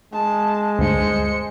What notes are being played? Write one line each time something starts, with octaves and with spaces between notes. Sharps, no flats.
G#3 A5
D2 G2 C5 C#7